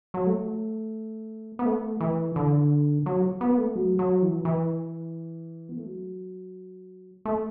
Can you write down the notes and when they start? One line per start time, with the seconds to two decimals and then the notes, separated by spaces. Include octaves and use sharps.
0.14 F#3
0.26 A3
1.59 B3
1.66 A3
2.01 E3
2.36 D3
3.06 F#3
3.41 B3
3.58 A3
3.75 F#3
3.99 F#3
4.22 E3
4.45 E3
5.69 B3
5.77 A3
5.85 F#3
7.25 A3